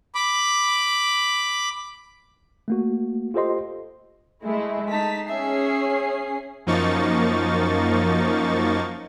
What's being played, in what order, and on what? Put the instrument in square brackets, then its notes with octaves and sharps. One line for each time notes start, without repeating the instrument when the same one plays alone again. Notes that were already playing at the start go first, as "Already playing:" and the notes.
[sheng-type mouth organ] B5 D6
[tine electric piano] A3 A#3 F#4
F4 G4 A4 C5 D#5 C6
[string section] G#3 A3 E4
[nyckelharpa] D#4 A5 [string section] B6
[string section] C#4 G#4 C7 [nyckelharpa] E5
[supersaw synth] F#2 F3 A#3 D#4 C#6 A6